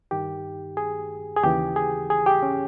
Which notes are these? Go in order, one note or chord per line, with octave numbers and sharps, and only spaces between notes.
G2 D#3 G4
G#4
G#4
D#2 C#3 E3 G4
G#4
G#4
G4
C#4